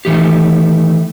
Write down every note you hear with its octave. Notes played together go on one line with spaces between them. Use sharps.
D#3 E3 A3 G4